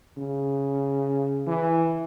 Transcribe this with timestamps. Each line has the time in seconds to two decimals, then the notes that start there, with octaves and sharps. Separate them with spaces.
0.17 C#3
1.47 E3